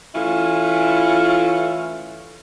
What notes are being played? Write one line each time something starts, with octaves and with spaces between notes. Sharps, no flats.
E3 A3 C#4 E4 F4